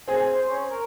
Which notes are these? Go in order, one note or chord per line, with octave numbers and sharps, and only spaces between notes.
C4 G#4 G#5
C5
C#4
A#4